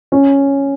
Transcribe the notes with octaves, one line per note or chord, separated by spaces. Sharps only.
C#4